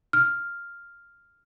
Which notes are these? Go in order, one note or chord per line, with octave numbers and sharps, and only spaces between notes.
F6